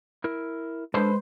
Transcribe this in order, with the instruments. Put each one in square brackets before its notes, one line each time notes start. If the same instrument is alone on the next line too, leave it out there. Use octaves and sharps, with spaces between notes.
[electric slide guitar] E4 A#4
[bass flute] G#3 [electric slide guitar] D4 A4 A5 [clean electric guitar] B4 C5